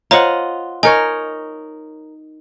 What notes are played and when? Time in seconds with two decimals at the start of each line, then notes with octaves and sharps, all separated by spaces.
0.11 F4 C5 C#5 D#5 F#5 A#5
0.83 D#4 A#4 C#5 G#5